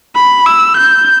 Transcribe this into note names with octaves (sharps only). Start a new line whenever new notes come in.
B5
E6
G6